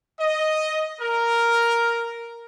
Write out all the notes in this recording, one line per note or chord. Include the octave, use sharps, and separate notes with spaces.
D#5
A#4